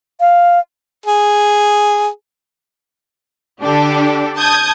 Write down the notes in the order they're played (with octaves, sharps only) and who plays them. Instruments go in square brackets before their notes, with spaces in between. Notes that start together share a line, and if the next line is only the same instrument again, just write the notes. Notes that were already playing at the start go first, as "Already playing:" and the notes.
[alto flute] F5
[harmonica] G#4
[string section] D3 D4 G4 A4
A5 D#6 G6 G#6